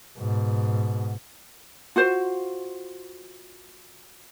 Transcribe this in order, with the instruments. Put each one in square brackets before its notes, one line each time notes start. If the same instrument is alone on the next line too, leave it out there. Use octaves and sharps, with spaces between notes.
[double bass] G#2 B2
[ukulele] F4 F#4 C5